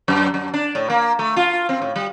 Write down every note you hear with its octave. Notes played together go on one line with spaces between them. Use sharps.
F#2
F#2
D4
A2
A#3
A3
F4
C4
A2
G3